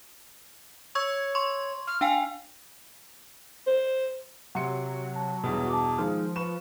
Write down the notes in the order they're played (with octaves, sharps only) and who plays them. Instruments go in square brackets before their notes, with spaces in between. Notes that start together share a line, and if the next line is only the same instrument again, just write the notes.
[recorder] C#5 [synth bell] C#6 E6 G#6
[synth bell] C6 C#6
[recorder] F6
[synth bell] D4 G5 G#5 [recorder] F5
[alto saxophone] C5
[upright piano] C3 C6 C#7 [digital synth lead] F#3 [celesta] F#5
[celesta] A5
[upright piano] E2 G2 B2
[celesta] A5 D6
[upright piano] D#3 G#3 [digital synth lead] F3 [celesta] F6
[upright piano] B4 C#6 E7